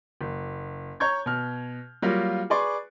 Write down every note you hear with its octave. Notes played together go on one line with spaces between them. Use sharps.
F#1
C#5 A#5 C#6 G6 G#6
B2 F6
F#3 G3 A#3 F4
G#4 B4 D5 C6 C#6